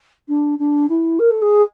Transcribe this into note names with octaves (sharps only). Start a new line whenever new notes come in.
D4
D4
E4
A#4
A4
G#4